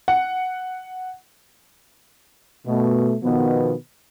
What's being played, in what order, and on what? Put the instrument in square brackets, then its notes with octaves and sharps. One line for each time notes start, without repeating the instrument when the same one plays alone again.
[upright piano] F#5
[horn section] B2 A3
B2 D#3 F3 B3